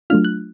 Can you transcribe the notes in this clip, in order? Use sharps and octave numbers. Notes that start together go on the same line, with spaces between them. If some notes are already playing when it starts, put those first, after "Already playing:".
F#3 A3 D4 F4 F6
F#6